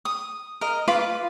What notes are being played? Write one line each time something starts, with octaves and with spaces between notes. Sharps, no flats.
D#6
A#4 D#5
F4 B4 B5 D6